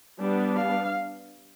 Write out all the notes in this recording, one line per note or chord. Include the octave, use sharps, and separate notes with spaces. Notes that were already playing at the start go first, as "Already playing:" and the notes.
G3 B3 D4
F5